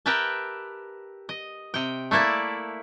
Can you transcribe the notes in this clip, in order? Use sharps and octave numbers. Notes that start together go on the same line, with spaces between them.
G4 A#4 B4 E5 G5 A5
D#5
C3 G5
A3 A#3 E4 D5 A5